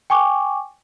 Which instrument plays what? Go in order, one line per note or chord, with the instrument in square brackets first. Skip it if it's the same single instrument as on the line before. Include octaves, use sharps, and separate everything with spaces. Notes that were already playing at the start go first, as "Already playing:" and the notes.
[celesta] G5 G#5 C#6 D6